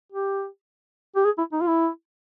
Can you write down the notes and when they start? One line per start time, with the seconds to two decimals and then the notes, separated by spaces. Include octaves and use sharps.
0.12 G4
1.16 G4
1.25 G#4
1.38 E4
1.52 D#4
1.61 F4
1.67 E4